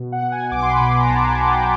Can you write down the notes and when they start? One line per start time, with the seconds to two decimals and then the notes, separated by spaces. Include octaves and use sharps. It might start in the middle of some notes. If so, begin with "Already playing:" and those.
Already playing: B2
0.12 F#5
0.22 B2
0.32 G#5
0.51 B1 D6
0.62 C6
0.71 B5
0.80 B2
1.01 A#5
1.09 B1 A5
1.29 G#5
1.39 B1 F#5
1.48 G5